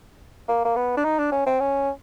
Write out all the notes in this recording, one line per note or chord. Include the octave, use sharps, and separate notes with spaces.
A#3
A#3
B3
D4
D#4
D4
C#4
C4
C#4